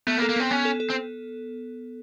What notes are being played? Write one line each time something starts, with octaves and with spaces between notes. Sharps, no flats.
A3 B3
A#3
A4
A#3
B3 C4
B3 C#4
A4
A4
C4